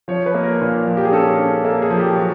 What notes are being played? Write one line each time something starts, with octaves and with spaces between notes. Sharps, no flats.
F3 C#5
B4
A#3
A#4
A#2
F3
G4
G#4
C#4 A4
C#4
A#3 A4
G#4
F3
G4
F#3 F#4